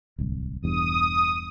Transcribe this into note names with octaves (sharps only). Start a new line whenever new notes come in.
D1 C2
E1 E2 G2 D#6